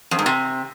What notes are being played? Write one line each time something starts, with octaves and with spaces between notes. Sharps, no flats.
F2
G#2
C3